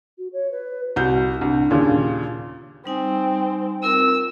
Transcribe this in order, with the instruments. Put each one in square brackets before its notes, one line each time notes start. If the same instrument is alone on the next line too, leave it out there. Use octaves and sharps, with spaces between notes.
[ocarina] F#4
C#5
B4
[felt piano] C2 G6 [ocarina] F#4
[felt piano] C2 [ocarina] D4
[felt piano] D#2 A#2 C#3
[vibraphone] G3 D#4 G#5 [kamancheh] C4
[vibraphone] C4 F4 A#4 [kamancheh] E6